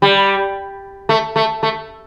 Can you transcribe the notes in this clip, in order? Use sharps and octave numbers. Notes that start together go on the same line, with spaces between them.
G3
A3
A3
A3